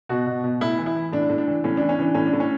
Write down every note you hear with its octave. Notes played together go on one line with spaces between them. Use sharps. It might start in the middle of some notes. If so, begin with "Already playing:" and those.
B2 F#4
B2
B2
A2 E4
E3
E4
E3
A2 D4
A2
D4
E3
A2 C#4
E3 D4
C#4
E3 D4
A2 C#4
D4
A2
C#4